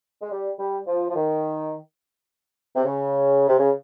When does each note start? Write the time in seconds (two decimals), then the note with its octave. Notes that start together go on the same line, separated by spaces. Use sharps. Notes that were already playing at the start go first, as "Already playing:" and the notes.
0.22 G#3
0.31 G3
0.59 G3
0.87 F3
1.10 F3
1.15 D#3
2.76 C3
2.85 C#3
3.49 C3
3.59 C#3